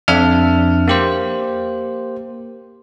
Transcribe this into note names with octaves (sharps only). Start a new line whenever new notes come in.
F2 D4 E5 F6
A#3 G4 C5